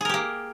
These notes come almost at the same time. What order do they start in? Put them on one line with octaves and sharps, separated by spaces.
G#4 A#4 G4 A#3